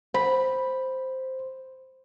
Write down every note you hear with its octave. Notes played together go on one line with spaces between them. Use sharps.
C5 B5